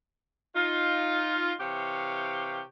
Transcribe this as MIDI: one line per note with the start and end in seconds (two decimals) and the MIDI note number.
0.56 1.53 63
0.56 1.53 65
1.61 2.63 48
1.61 2.63 52
1.61 2.63 67
1.61 2.63 73
1.61 2.63 77